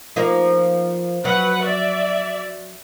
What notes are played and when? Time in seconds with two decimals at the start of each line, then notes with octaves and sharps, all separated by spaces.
0.16 F3 A#3 D#4
1.25 F#3 B4 F#5
1.64 D5 E5